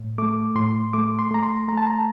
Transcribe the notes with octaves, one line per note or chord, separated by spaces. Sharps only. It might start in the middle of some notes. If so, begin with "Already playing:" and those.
Already playing: A2
A3 D6
A2 C6
A3 D6
C6
A3 A#5
C6
A3 A#5
A5
A#5